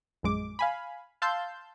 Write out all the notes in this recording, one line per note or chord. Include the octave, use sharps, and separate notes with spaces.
A#1 F#2 G#3 D6
F5 G#5 B5
F5 A5 C6 E6 G6